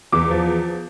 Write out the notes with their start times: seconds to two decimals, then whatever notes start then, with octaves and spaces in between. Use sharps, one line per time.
0.12 E2 D6
0.30 F3